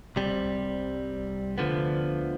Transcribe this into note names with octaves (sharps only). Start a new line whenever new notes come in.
C2 C3 G3
D2 D3 F3 B3